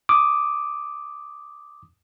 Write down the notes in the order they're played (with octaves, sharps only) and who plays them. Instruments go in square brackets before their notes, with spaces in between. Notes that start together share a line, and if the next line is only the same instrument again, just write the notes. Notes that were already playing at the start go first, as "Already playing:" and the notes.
[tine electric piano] D6 D#6